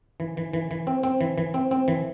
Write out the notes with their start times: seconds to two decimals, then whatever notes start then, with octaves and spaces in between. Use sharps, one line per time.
0.20 E3
0.37 E3
0.53 E3
0.71 E3
0.87 C4
1.03 C4
1.21 E3
1.38 E3
1.54 C4
1.71 C4
1.88 E3